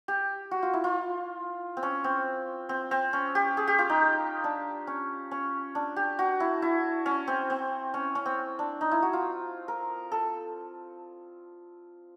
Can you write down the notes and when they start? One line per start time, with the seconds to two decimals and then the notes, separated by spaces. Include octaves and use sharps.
0.08 G4
0.51 F#4
0.63 F4
0.74 E4
0.84 F4
1.77 C4
1.83 C#4
2.04 C4
2.69 C4
2.91 C4
3.13 C#4
3.35 G4
3.57 G#4
3.67 G4
3.79 F4
3.90 D#4
4.44 D4
4.87 C#4
5.31 C#4
5.75 D4
5.96 G4
6.19 F#4
6.40 E4
6.62 E4
7.06 C#4
7.28 C4
7.50 C4
7.94 C#4
8.15 C#4
8.26 C4
8.59 D4
8.81 D#4
8.92 E4
9.02 F#4
9.13 F4
9.68 A#4
10.12 A4